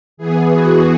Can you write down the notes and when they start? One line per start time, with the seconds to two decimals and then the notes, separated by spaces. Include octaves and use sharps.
0.17 E3 B3 G#4
0.51 F#4